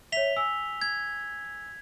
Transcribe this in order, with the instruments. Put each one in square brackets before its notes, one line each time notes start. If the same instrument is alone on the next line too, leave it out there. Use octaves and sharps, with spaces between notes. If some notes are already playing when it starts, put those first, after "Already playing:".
[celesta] C#5 E5 [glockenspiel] B6 F7 G7
[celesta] G#5 E6
[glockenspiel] G#6